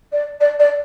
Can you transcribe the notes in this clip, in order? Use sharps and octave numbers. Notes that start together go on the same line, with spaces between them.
D5
D5
D5